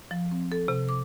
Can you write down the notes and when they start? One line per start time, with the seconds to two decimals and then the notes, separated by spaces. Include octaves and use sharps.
0.11 F3
0.31 C4
0.52 A4
0.68 C3
0.89 D6